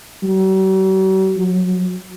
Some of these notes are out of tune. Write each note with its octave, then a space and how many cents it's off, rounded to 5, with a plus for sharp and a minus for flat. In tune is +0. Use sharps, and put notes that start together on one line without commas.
F#3 +45
F#3 -25